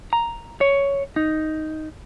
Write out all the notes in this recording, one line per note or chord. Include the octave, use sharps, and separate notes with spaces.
A#5
C#5
D#4